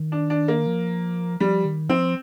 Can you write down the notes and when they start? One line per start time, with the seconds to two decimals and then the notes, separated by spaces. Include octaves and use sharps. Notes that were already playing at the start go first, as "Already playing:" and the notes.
Already playing: D#3
0.12 D4
0.30 D4
0.48 A#3
0.67 F3
1.40 F3 G3
1.65 D#3
1.89 F3 C4